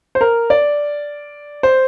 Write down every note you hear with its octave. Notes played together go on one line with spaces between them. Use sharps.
C5
A#4
D5
C5